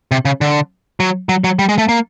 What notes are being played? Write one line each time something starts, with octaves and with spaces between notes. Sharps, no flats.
C3
C#3
D3
F#3
F#3
F#3
G3
G#3
A3
A#3